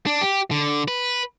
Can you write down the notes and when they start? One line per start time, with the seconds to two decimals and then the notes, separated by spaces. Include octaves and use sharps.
0.06 D4
0.21 G4
0.51 D3
0.88 B4